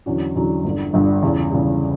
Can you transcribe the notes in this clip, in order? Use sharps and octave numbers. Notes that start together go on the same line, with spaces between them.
E2 D3 F#3 C#4 F#4
E2 D3 F#3 C#4 F#4
G1 G2 D3
G1 G2 D3
E2 C#3 G3
E2 C#3 G3